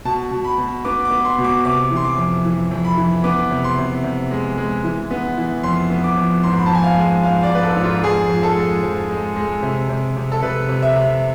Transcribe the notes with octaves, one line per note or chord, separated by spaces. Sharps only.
B2 A5
B2
B5
B2
B3 D6
D6
B3
C6
B2
D6
C3 D6
E3
C6
D6
F2
E3
F2
B5
E3
B3 D6
C3
C6
C3
C3
G#3
G#3
E3
B3
E3
F2 C6
B3
D6
F2
G#2 C6
B5
F3 A5
G#5
F5
G#3
G#2 F5
D5
G#2
B4
A4
G#2
F4
F2 G#4
F3
A4
G#3
F3
G#3
G#3
C3
C3
C3
A4
C3 B4
C3
E5
C3